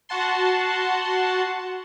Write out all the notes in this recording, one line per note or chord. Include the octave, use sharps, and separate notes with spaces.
F#4 F#5 A5 C6